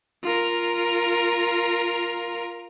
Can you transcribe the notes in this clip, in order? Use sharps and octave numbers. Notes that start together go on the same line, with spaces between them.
F4 A#4